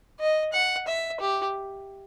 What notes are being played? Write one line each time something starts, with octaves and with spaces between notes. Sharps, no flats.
D#5
F#5
E5
G4